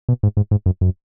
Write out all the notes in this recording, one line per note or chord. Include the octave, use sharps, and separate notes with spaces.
B2
G#2
G#2
G#2
F#2
F#2